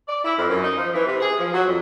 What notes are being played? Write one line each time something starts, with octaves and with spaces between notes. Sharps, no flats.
D5
E4
F2
F#2
D#4
F3
E3
C3
G#4
F3
F#3
F2